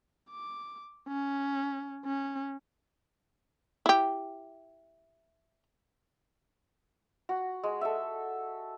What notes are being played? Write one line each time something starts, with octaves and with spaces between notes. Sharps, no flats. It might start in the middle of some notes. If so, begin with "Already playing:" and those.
D6
C#4
C#4
E4 G4
F#4
G#3
A4 E5